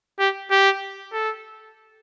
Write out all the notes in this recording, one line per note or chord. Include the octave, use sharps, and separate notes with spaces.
G4
G4
A4